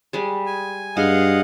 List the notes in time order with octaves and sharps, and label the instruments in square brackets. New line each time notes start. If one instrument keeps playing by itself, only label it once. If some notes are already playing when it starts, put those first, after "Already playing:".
[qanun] G3 G#3
[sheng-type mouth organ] G#5
[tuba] G2 [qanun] G#4 C6 [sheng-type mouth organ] D#5 F5 F#5